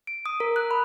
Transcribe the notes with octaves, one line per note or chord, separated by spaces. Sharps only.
D7
D#6
A#4
F#6
B5